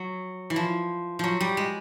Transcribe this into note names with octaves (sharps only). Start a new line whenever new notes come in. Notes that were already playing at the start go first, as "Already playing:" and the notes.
Already playing: F#3
E3
F3
F3 F#3
G3
G#3